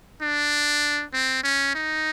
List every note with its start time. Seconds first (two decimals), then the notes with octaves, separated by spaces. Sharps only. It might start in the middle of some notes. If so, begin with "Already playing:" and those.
0.22 D4
1.13 C4
1.44 C#4
1.75 D#4